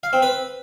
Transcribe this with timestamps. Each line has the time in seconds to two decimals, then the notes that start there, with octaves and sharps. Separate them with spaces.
0.03 F5
0.13 C4
0.22 B4